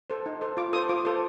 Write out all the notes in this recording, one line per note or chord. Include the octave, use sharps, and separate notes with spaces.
A4 C5
D#4
A4 C5
F4 D6
A4 C5 D#6
F4 D6
A4 C5